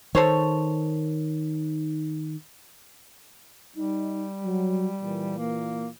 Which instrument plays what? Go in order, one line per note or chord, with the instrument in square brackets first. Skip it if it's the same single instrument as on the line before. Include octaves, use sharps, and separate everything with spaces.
[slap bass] D#3 [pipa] A4 C5 C#5
[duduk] G3 [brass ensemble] D#4
[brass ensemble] F#3
A#2 E3
[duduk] A#3